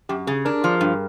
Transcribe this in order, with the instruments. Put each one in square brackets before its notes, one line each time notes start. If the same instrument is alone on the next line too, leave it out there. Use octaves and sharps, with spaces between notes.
[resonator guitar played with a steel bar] F#2 [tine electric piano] G4
[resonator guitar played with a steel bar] C#3 [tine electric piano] G#4
[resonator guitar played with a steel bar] D4 [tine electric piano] A#4
[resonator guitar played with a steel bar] F3
G2